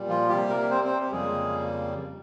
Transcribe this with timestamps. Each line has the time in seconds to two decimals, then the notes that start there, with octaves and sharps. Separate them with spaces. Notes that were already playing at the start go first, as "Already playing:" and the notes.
Already playing: A#2 G3
0.09 F3 F4
0.29 C3 G3 A#3 G4
0.49 A#3 A#4
0.70 C4 C5
0.84 C4 C5
1.00 G4
1.11 F2 C#3 G3 G#3 A#3 G#4